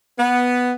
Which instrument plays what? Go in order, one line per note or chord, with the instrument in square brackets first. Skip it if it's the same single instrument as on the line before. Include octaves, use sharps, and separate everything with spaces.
[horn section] B3